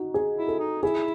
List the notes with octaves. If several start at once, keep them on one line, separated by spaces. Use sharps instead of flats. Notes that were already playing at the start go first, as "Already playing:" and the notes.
Already playing: D#4 F#4
G#4
E4
A4
D#4
E4 G#4